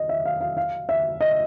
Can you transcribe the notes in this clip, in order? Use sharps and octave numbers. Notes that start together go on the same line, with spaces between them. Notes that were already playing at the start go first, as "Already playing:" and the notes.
Already playing: D#5
E5
F5
F5
F5
E5
D#5